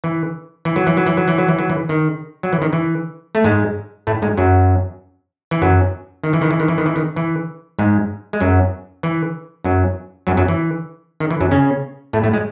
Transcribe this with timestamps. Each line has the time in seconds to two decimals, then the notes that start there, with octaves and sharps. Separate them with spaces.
0.04 E3
0.65 E3
0.76 F#3
0.87 E3
0.97 F#3
1.07 E3
1.17 F#3
1.28 E3
1.38 F#3
1.48 E3
1.59 F#3
1.69 E3
1.89 D#3
2.43 F#3
2.53 E3
2.62 D#3
2.73 E3
3.35 A3
3.44 G#2 G#3
4.07 A2 A3
4.22 G#2 G#3
4.37 F#2 F#3
5.51 E3
5.62 F#2 F#3
6.24 D#3
6.33 E3
6.41 D#3
6.51 E3
6.60 D#3
6.68 E3
6.78 D#3
6.86 E3
6.96 D#3
7.16 E3
7.79 G#2 G#3
8.33 G#3
8.40 F#2 F#3
9.03 E3
9.64 F#2 F#3
10.27 F#2 F#3
10.37 F#2 F#3
10.48 E3
11.20 D#3
11.31 E3
11.41 F#2 F#3
11.51 C#3 C#4
12.13 A2 A3
12.24 A2 A3
12.34 G#3